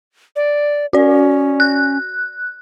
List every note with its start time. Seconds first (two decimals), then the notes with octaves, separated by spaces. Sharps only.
0.36 D5
0.93 C#4 F#4 D5
1.60 F#6